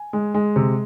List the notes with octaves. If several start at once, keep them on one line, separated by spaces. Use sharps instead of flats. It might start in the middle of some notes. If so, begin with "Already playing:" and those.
Already playing: G#5
G#3
G#3
C3